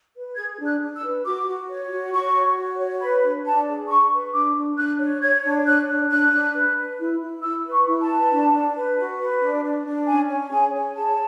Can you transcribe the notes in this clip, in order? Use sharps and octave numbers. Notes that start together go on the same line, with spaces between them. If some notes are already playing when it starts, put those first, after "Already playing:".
B4
G#4 G#6
D4
F#6
D4
E6
B4
F#4 D6
F#4
C#5
F#4
F#4 C#6
C#5
F#4
C#5
B4 B5
D4
D4 A5
G#4
D4 C#6
B4
D4 D6
D4
D4 F#6
C#5
C#5 G#6
D4
C#5 F#6
D4
D4 F#6
D4
B4
B4
E4
E4
E4 E6
B4
C#6
E4
A5
B4
D4
D4
B4
F#4
B4
D4
D4
D4
C#4 G#5
C#5
G#4 G#5
C#5
G#4 A5